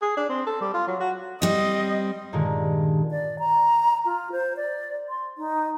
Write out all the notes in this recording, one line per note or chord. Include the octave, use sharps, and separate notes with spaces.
G#4
D4
C4
A4
G3
F4
F#3
F#4
G3 C4 D#5
G2 A#2 D3 D#3 G#3
D5
A#5
F4
C5
D5
C6
D#4